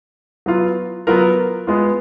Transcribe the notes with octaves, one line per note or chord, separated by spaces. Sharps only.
F#3 B3 F4
F#3 B3 F4 A#4
G#3 B3 F4